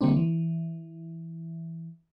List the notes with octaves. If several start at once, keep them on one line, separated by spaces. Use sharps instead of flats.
D3 G3 A#3 C4 D4
E3